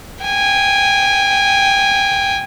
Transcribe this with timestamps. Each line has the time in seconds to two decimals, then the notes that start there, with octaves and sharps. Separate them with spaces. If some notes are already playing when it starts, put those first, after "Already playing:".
0.25 G5 G#5